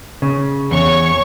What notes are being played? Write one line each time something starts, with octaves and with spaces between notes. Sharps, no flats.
C#3
E2 C#5 C#6